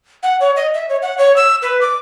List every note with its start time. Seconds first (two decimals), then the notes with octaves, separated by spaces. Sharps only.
0.23 F#5
0.40 C#5
0.56 D#5
0.74 E5
0.89 C#5
1.02 F#5
1.18 C#5
1.36 E6
1.62 B4
1.81 D6